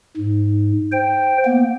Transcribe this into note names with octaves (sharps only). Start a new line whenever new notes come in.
G#2
C5 G5
A#3 B3